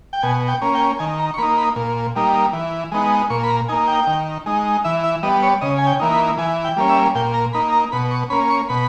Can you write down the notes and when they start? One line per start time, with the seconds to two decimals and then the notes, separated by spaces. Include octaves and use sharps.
0.13 G5
0.23 B2 G#5
0.48 G5
0.61 A#3 C#4
0.75 G5
0.99 D#3 G#5
1.19 A#5
1.34 C#6
1.38 A#3 D#4 B5
1.58 B5
1.76 A#2
2.16 G3 A#3 D#4
2.53 E3
2.92 G#3 B3 D#4
3.30 A#2 C#6
3.44 B5
3.50 A#5
3.68 A#3 D#4 G#5
3.88 G5
4.07 D#3
4.46 G#3 D#4
4.84 E3 E5
5.04 E5
5.23 G3 B3 D#5
5.43 C#5
5.61 C#3 D#5
5.78 G#5
5.87 G5
6.00 E3 A#3 D#4
6.12 B5
6.38 E3 G#5
6.65 G5
6.77 G3 A#3 C#4
6.89 E5
7.15 A#2 G5
7.34 A#5
7.53 A#3 D#4 B5
7.72 A#5
7.92 B2 B5
8.11 C#6
8.30 A#3 C#4 B5
8.50 C#6
8.69 B2 B5